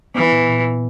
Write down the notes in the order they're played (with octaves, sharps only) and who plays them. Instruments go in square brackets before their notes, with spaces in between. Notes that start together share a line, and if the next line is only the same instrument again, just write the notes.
[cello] E3 [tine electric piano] B3
[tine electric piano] A#2
A#2